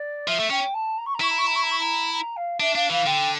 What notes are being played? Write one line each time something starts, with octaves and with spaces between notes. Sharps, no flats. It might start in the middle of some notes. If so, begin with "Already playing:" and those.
Already playing: D5
F3 E5
A3
C#4 G5
A5
A#5
C#6
A#5
E4 C#6
A#5
C#6
A#5
C#6
A#5
C#6
A#5
A#5
F5
D4 E5
D4 F5
E3 F5
D3 G5